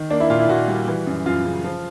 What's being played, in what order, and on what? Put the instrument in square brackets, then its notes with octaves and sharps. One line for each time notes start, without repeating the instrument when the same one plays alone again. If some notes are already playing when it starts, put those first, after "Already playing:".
Already playing: [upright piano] D#3
A#3 D4
E4
A#2 F4
E4
A#2 F#4
G3
E3
F#2
F#2 F4
C#3
F3